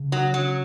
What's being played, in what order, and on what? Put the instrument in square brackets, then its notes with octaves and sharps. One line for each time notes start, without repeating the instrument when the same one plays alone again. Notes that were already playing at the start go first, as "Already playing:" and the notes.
Already playing: [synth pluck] C#3
[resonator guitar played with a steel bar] F#3
F#3